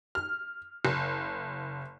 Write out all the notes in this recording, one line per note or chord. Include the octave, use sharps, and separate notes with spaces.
F6
F#1